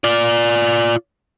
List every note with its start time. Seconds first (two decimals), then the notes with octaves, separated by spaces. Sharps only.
0.04 F4 D5